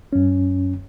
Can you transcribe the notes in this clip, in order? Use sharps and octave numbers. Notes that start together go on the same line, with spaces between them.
F#2 C#4